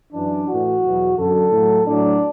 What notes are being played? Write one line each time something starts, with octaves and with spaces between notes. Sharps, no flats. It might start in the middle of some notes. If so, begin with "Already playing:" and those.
F#2 E3 D4
A2 E3 F#4
E2 B2 F#3
F#2 D3 F#3 A4
A2 F#3
A2 F#3 D4